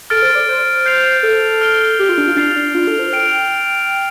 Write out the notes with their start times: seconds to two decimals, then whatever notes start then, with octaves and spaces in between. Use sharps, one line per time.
0.10 A4 F6 A6 D7
0.22 C5
0.35 D5
0.49 C5
0.86 G6 C7 F7
1.23 A4
1.61 F6 D7 G7
1.99 G4
2.09 F4
2.18 D4
2.28 F4
2.37 D4 A6 C7 F7
2.56 D4
2.75 F4
2.87 A4
2.99 C5
3.13 G5 F6 D7 F7